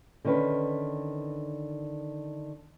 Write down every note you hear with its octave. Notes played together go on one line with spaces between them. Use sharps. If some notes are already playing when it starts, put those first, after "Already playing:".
D3 D#3 C#4 B4